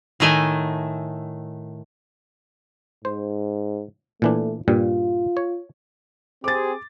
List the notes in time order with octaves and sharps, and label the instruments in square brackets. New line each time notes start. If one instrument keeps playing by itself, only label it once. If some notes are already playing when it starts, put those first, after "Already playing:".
[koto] A2 D#3 A3 G#5
[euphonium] G#2 [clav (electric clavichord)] C5
[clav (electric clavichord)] A#2 E3 D4 [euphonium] A3
[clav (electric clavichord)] G2 A#2 G3 [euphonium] F4
[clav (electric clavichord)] C#5
[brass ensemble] C4 G4 G#4 [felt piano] D6 A6